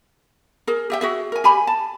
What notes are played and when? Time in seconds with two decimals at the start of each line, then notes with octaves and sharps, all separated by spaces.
0.67 G#4 A#4
0.90 G4 E5 G5
1.01 F#4 G#4 E5
1.32 A#4 G#5
1.44 G4 G#5 B5
1.67 A5